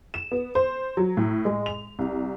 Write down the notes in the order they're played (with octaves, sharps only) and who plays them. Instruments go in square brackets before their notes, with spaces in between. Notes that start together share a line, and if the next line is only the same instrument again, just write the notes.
[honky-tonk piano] E7
B3
C5
F#3
A2
G#3
F7
C2